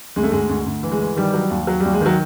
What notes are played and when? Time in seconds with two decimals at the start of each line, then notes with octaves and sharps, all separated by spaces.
0.16 D2 G#3
0.23 A3
0.32 D2 G#3
0.49 D2
0.66 D2
0.83 E3
0.92 G#3
1.01 E3
1.16 D#3 G3
1.33 F#3
1.51 D#2
1.67 F#3
1.80 G3
1.85 D#2
1.93 G#3
2.01 D#3 F#3